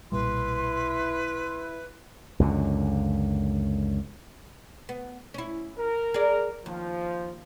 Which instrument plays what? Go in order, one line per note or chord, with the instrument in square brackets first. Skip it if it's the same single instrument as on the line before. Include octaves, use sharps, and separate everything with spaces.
[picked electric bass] B1 A#2 G3 [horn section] E4 [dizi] B4 [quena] C6
[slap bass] C#2 F#2 D3
[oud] B3
C#4 E4
[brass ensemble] A#4
[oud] G#4 D5
[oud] D#2 [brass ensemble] F3